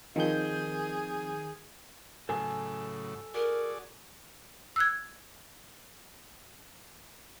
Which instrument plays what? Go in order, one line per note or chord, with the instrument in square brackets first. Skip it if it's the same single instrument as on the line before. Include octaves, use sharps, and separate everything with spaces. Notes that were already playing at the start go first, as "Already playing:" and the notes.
[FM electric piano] D#3 G6 [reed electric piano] F3 C4 [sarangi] G#4
[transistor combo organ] A2 C#3 F#3 [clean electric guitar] A4 G#5
[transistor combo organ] F#4 G#4 D5 [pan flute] A#4
[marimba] E6 F#6 G#6